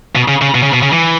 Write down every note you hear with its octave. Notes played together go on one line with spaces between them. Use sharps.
B2
C#3
C#3
B2
C#3
B2
C#3
E3